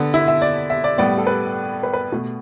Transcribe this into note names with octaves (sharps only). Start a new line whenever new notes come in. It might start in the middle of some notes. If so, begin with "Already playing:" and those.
Already playing: D3 B3 A4
E4
E5
D5
E5
D5
A2 G3 B3 D5
A4
B4
B4
B4
B2 A3